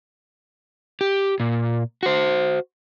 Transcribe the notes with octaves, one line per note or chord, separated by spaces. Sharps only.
G4
A#2
F#4 C5